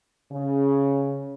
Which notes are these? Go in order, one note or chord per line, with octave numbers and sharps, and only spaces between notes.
C#3